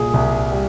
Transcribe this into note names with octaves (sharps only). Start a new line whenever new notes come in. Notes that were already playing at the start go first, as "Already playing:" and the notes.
Already playing: C2 A#2 G#4
C2
G3